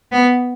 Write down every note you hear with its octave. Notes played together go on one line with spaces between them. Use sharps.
B3